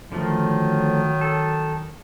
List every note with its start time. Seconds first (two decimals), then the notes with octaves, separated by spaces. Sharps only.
0.12 D3 D#3 F3 F#3 A3
1.21 A4